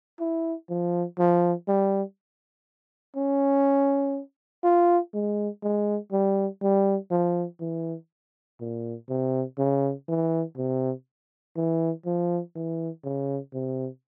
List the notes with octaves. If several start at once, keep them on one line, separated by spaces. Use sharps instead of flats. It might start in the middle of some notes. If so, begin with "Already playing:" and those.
E4
F3
F3
G3
C#4
F4
G#3
G#3
G3
G3
F3
E3
A#2
C3
C#3
E3
C3
E3
F3
E3
C#3
C3